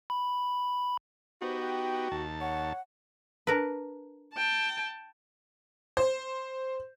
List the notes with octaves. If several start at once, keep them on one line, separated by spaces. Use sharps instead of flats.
B5
B3 D#4 F#4 G4 C5
G5
D#2 A5
C#5 F#5
D4 A#4 B4
G5 A5
C5